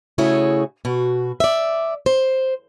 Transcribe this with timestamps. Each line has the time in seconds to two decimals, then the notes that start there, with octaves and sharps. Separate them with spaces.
0.18 C#3 A3 E4 F#4 G#4 C#5
0.85 B2 F#4
1.40 D5 E5
2.06 C5